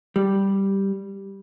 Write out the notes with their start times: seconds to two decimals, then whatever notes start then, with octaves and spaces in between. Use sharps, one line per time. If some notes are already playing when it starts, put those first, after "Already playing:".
0.16 G3